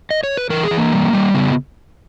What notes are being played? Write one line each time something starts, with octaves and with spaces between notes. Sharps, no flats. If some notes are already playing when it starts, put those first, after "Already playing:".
D#5
C#5
B4
E3 A#4
G#4
E3
A#3
G3
G3
C#3 B3